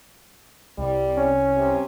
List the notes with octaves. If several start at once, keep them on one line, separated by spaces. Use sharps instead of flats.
C2 G3
C#4
C3